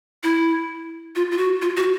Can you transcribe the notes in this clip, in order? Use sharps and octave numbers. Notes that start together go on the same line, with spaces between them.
E4
F4
F4
F#4
F4
F#4